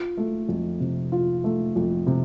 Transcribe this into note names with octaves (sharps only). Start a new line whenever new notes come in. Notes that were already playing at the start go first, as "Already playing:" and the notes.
Already playing: F4
A3
F2
C3
F4
A3
F2
C3